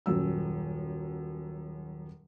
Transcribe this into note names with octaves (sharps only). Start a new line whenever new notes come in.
D#1 F#2 E6